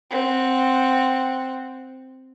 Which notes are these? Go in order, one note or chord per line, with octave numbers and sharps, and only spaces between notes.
C4 F#5